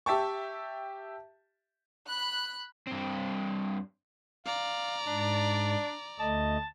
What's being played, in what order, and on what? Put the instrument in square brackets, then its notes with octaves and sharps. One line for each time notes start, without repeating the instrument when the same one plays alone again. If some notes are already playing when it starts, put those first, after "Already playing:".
[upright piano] G4 E5 G5 A5 C#6
[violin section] B5 F#6
[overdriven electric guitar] G2 C4
[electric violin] D5 A#5 [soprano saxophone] F5
[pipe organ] G#2 [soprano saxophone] D4
[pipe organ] D2 A3 D#5 [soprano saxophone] A5